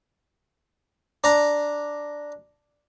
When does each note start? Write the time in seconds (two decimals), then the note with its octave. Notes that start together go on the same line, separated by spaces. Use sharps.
1.24 D4 A#5